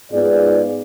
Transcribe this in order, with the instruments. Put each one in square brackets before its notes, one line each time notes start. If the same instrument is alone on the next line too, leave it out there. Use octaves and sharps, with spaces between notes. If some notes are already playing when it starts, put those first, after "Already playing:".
[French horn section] G#2 B3 F4 G#4 D5